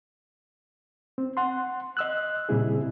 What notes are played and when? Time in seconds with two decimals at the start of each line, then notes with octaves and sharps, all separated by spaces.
1.18 C4
1.37 F#5 C6
1.97 D#5 E6 F#6
2.49 A#2 C#3 G3 C4 E4 G#4